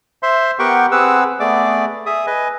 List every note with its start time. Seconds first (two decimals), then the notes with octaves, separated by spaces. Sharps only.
0.23 C5 E5 C6
0.59 B3 G4 A#4 F#5 G5 C#6
0.91 C4 G#4 B4 F#5 E6
1.40 A3 B3 G#4 D5 D6
2.06 G#4 E5 D#6
2.27 B4 D#5 G#5